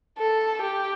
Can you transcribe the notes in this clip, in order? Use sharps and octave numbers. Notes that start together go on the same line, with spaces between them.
A4
G4